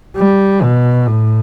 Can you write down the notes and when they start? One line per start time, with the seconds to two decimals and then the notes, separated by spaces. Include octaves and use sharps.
0.17 G3
0.62 B2
1.07 A2